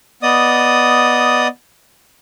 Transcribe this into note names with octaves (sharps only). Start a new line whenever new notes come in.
B3 D5 D#5 D#6